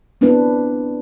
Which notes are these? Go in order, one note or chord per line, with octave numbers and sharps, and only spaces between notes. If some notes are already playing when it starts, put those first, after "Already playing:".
B3 C4 D4 E4 B4